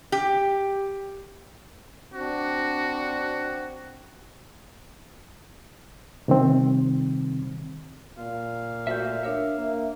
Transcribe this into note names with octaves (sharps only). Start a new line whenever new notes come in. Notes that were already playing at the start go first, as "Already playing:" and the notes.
G4
C4 D4 F#4
C3 D#3 G3 C4
A#2 F5
A3 F#4 C5 E5 G6
D4 A#4 C#5 E5
A#3